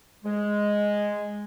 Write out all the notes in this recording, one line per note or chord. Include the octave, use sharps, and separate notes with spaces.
G#3